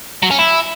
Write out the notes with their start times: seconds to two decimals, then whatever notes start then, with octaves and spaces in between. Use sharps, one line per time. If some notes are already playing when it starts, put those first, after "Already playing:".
0.23 F#3
0.31 C#4
0.39 E4